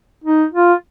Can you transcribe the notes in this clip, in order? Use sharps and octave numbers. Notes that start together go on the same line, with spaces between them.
D#4
F4